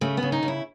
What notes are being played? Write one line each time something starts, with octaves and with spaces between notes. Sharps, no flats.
C#3 A3
B3
C#3
D#4
C#3
E4